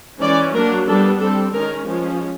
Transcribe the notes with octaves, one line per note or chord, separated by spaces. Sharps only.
E3 G#3 C#4 D5
F#3 A#3 D4 A#4
G3 B3 D4 A4
G3 C4 A4
D#3 G#3 C#4 A#4
F3 G#3 C#4